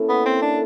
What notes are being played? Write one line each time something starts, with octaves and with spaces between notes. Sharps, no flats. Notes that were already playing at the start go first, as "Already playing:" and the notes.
Already playing: A#3 C#4 E4 A4
B3
C4
D4